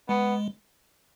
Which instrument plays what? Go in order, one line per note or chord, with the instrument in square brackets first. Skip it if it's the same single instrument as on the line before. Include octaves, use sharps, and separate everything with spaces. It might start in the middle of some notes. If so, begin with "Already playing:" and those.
[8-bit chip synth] G#3 [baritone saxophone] B3